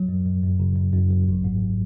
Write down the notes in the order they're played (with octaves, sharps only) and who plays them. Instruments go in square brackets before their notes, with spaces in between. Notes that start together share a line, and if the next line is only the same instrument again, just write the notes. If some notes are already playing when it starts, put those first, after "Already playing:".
Already playing: [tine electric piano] F#3
F#2
F#2
F#2
C#3
F#2
F#2
F#3
G#1
G#2